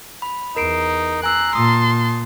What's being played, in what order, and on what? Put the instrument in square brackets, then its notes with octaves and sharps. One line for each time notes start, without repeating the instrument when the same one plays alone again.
[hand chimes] B5
[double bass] E2 [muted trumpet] D#4 [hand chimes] A#4 C7 D7
[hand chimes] G#5 E6 C7 [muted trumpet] A#5 [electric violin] F#6
[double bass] A#2 [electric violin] A5 C6 [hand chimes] D#6